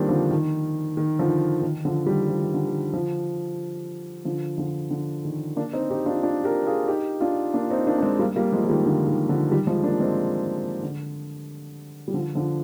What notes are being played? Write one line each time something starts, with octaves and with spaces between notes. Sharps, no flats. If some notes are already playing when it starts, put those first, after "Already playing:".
Already playing: D#3 G3 A#3 C4 D4 D#4 F4
D3 F3
D#3
D#3
D3 F3
D#3
D3 F3
D#3 G3
F3
D#3
D3
D#3
D3 F3
D3 F3
D3 F3
D3
D#3
A#3 D4
C4 D#4
D#4 G4
D4 F4
D4 F4
G4 A#4
F4 G#4
D#4 G4
D4 F4
A#3 D4
C4 D#4
A#3 D4
D4
G#3 C4
G3 A#3
G3 A#3
F3 G#3
F3
D#3 G3
D3 F3
D#3
D3 F3
D#3 G3
F3 G#3
A#3 D4
G#3 C4
D3
G3
D3 F3
D3 F3